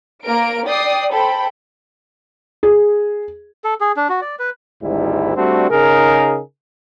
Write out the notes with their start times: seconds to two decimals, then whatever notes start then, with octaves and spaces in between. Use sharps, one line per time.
0.24 A#3 A#4 D7
0.65 D5 G5 D#6 C7
1.12 A4 C5 G5 B5
2.63 G#4
3.64 A4
3.81 G#4
3.97 D4
4.09 F#4
4.21 D5
4.39 B4
4.83 G#1 D2 G#2 G3 E4
5.36 G3 A3 C4 D4 F#4
5.71 C#3 D#4 G#4 A#4